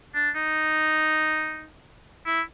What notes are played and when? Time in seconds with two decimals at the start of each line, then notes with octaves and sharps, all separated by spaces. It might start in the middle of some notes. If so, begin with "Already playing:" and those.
0.15 D4
0.36 D#4
2.26 E4